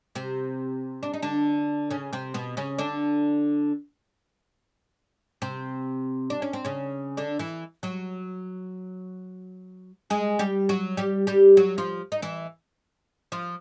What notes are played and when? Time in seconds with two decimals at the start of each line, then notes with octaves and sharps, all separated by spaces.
0.15 C3 C4
1.03 D4
1.14 D#4
1.22 D3 D4
1.90 C#3 C#4
2.13 C3 C4
2.34 B2 B3
2.57 C#3 C#4
2.78 D3 D4
5.42 C3 C4
6.30 D4
6.42 C#4
6.53 C4
6.65 C#3 C#4
7.17 D3 D4
7.39 E3 E4
7.83 F#3 F#4
10.10 G#3 G#4
10.39 G3 G4
10.69 F#3 F#4
10.97 G3 G4
11.27 G3 G4
11.57 F#3 F#4
11.78 F3 F4
12.12 D#4
12.22 E3 E4
13.32 F3 F4